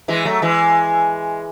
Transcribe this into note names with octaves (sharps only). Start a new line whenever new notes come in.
E3 G#3
F#3 A3
E3 G#3